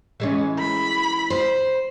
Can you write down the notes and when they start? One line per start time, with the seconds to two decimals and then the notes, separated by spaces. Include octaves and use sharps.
0.20 E3 G#3 C#4
0.59 B5
1.30 C5